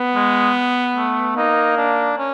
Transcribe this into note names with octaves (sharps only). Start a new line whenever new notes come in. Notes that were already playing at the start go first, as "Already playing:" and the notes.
Already playing: B3
G#3
A3
A#3 D#4
D4
C#4